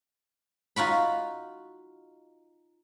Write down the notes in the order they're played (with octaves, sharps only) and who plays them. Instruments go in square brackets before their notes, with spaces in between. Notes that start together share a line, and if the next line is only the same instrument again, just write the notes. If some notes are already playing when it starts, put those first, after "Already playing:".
[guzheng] D#4 F4 F#4 B5